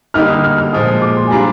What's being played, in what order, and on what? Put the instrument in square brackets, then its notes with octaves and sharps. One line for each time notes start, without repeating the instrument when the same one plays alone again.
[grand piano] D3 G3 A#3 D#4 G4 [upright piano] F6
[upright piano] D#6
F6
F6
[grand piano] A#2 F3 G#3 [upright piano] D#6
[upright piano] D6
C6
G#5
[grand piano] G3 D4 F4 [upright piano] A#5